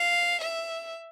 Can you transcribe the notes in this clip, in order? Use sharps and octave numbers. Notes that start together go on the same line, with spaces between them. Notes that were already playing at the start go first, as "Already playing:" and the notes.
Already playing: F5
E5